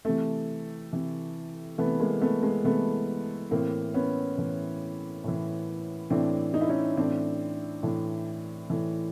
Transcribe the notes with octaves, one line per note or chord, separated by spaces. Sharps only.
C3 E3 A3
C3 E3
C3 E3 A3 B3
G#3 A#3
A3 B3
G#3 A#3
C3 E3 A3 B3
A2 E3 A#3 C4
B3 C#4
A2 E3
A2 E3
A2 E3 C4 D4
D#4
E4
C#4 D#4
A2 E3 C4 D4
A2 E3
A2 E3